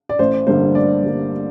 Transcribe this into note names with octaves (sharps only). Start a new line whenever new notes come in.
D5
A1 C5
G2 D3 G3 A#3 C5
A1 D5
G2 D3 G3 A#3